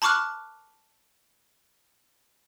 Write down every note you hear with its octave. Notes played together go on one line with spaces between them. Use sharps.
A5 B5 C#6 D6 F6 F#6